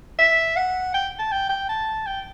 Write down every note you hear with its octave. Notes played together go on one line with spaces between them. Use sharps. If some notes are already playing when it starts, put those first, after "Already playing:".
E5
F#5
G5
A5
G5
G5
A5
G5